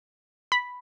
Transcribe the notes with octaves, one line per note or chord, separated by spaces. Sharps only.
B5